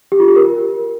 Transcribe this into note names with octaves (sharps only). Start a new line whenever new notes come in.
G4
F4
G4
A#4